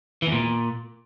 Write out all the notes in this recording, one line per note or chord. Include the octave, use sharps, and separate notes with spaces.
E3
E2
A#2